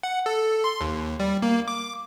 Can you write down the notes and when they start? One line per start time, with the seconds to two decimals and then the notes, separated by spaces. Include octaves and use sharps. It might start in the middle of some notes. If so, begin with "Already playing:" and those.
0.03 F#5
0.26 A4
0.64 C6
0.81 D#2
1.20 G3
1.42 A#3
1.68 D6